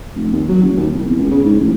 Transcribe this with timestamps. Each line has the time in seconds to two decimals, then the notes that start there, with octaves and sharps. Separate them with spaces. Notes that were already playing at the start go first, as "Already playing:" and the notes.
0.16 F1
0.33 D#2
0.48 F#3
0.63 F#1
0.77 D#2
0.92 C2
1.05 E2
1.18 C#2
1.31 C#3
1.44 G#2
1.60 A1